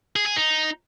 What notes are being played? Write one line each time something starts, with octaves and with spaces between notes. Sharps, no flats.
G#4
G#4
D#4